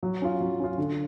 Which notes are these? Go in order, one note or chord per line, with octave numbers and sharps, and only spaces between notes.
F#3
C#4 F4
F#3
C#4 F4
D3